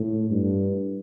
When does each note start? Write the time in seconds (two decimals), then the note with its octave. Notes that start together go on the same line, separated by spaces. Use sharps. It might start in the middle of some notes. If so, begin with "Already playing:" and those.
Already playing: A2
0.30 G2